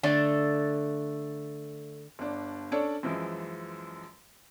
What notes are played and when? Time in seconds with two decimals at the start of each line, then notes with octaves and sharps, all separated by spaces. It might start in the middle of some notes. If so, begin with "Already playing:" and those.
0.03 D3 A3 A4
2.19 G1 D4
2.72 C#4 D4 A4 C#5 D5
3.03 F#2 E3 F3 G#3